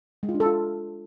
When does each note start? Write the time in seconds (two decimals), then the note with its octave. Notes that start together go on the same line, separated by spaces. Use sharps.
0.23 G#3
0.29 F4
0.34 D4
0.40 A4
0.46 F4